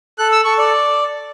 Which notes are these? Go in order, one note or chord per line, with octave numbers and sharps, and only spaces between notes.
A4 F#6
E6
A4 C#6
D5